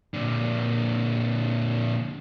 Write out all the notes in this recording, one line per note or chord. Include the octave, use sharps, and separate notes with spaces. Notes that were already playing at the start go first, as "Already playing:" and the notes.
A#2 D3